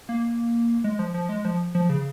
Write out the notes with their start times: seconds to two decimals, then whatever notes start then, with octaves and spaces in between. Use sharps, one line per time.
0.09 A#3
0.84 G#3
0.99 F3
1.14 F3
1.29 G#3
1.45 F3
1.75 F3
1.89 C#3